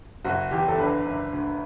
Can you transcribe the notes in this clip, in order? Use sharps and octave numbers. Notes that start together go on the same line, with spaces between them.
F#1 F#4
E2 G4
A4
D3 B4
F#1
D2